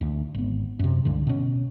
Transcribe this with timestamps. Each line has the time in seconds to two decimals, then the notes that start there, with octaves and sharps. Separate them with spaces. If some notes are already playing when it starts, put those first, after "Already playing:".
0.01 D2
0.34 G#1 B3
0.79 F#2 C3
1.05 C#2 G2 D3
1.27 B2 C#4